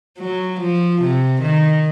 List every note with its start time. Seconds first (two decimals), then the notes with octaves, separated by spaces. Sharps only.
0.19 F#3
0.60 F3
1.02 C3
1.42 D#3